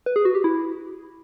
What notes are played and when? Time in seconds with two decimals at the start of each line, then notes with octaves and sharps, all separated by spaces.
0.06 B4
0.16 G#4
0.25 F#4
0.35 G4
0.44 E4